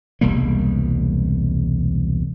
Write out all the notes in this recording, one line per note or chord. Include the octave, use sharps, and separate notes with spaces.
E1 C2 G3 A#3